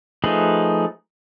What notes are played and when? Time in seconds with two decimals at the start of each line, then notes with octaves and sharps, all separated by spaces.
0.24 F3 A3 D#4 G#4 B4